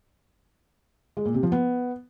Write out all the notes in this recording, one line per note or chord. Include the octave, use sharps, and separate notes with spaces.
G#3
A#2
C3
F3
B3